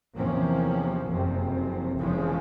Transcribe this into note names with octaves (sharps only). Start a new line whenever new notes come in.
E2 C3 F3 A#3 C#4
F#1 F2 C3
F1 E2 C#3 F3 G#3